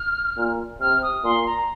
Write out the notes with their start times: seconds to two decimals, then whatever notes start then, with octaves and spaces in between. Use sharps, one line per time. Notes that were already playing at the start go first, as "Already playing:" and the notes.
Already playing: F6
0.37 A#2
0.81 C3 F6
1.02 D#6
1.23 A#2 C6
1.46 A#5